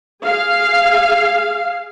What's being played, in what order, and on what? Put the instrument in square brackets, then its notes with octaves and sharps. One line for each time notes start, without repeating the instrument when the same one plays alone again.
[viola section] G#4 F5